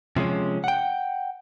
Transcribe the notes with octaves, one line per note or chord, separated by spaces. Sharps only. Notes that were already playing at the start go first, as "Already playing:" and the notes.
C3 F3 G#3 C#4
F#5 G5